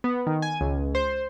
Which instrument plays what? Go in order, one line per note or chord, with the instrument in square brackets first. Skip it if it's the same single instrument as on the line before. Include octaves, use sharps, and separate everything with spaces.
[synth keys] B3
D#3
G#5
C#2
C5